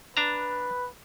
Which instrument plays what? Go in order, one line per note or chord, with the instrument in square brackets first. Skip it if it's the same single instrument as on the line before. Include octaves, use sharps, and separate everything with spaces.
[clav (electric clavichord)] D4 A5 A#5 [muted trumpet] B4